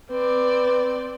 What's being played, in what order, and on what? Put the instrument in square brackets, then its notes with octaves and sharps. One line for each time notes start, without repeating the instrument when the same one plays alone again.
[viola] C4 D5 [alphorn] B4